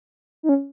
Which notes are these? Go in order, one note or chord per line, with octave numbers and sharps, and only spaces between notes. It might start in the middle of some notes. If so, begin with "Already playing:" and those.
D#4
C#4